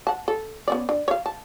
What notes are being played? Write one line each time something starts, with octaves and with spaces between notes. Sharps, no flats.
F#5 A5
A4
B3 C#4 D5
D4
C#5 F5
A5